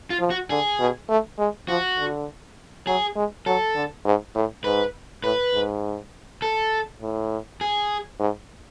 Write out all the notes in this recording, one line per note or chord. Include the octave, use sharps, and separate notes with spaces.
F4
F3
F#4
D3 G#4
B2
A3
G#3
F3 F#4
D3
F#3 G#4
G#3
F#3 A4
D3
G#2
A2
G#2 B4
A2 B4
G#2
A4
A2
G#4
G#2